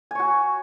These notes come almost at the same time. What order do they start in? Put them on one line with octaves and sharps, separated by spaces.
G#5 C#5 F#4